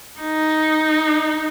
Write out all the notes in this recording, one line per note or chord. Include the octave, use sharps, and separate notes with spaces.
D#4